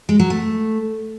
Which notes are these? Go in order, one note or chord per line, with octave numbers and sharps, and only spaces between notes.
G#3
F#3
A3